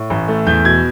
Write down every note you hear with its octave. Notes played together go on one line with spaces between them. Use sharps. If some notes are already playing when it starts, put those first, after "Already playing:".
Already playing: A2
A1
A3
E2 G6
B2 G#6